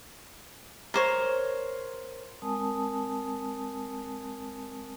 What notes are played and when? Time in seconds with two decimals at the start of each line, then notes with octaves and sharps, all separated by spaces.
0.94 A#4 C5 C#5
2.42 G#3 C4 A#4 G#5 A5 D#6